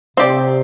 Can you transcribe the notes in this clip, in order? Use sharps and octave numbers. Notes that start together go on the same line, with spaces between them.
C3 C4 G4 D5